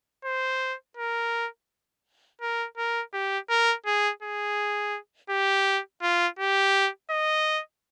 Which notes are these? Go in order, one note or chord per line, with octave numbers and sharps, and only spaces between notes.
C5
A#4
A#4
A#4
G4
A#4
G#4
G#4
G4
F4
G4
D#5